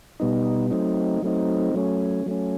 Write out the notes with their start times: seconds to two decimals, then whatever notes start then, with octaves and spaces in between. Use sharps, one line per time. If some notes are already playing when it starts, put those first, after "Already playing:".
0.20 B2 G3 B3 D#4
0.71 F#3 A3 C4 D#4
1.22 F#3 A3 C4 D#4
1.74 F#3 A3 C#4
2.26 F#3 A3 C#4